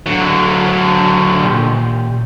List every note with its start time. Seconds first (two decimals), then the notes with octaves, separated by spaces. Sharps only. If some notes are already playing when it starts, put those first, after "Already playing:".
0.06 D3 F#3
1.44 A#2 G4 C6